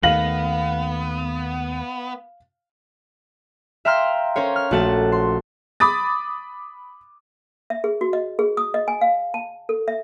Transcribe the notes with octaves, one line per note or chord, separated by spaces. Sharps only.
D#2 D#3 A3 B3 F5 A#6 F#7
E5 F5 G5 A#5 C6 F6
C#4 A#4 C5 C#5
F6
A#1 A3 F#4 F#5 A5 A6
C6
B5 D6 D#6 A6
E5
G#4
F#4
D#5
G#4
D#6
D#5
G#5
F5
A5
A4
E5